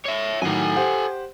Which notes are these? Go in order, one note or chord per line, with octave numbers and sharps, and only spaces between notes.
C#5 E5
A2 D#3 F#3 A4 G#5
G4 C5 F#5